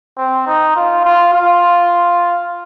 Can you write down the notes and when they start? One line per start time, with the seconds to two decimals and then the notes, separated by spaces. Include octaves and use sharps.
0.17 C4
0.47 D#4
0.76 F4
1.05 F4
1.33 F4